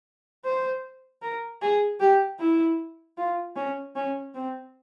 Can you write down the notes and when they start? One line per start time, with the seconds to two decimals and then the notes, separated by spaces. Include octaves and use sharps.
0.45 C5
1.22 A#4
1.62 G#4
2.00 G4
2.40 E4
3.18 F4
3.56 C#4
3.96 C#4
4.34 C4